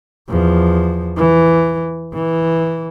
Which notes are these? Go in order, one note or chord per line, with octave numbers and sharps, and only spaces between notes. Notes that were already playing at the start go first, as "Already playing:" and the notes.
E2 F3
E3
E3